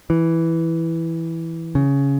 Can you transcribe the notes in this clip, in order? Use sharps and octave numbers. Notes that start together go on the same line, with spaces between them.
E3
C#3